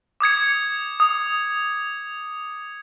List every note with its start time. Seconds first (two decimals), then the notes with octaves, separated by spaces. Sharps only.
0.20 D6 D#6 G#6 C#7
1.00 D#6